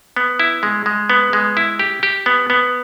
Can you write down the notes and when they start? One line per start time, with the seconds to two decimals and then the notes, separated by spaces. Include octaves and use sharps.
0.16 B3
0.40 E4
0.63 G#3
0.86 G#3
1.10 B3
1.33 G#3
1.57 E4
1.79 G4
2.03 G4
2.26 B3
2.50 B3